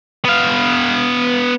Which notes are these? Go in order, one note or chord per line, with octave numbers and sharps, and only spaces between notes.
B3 F5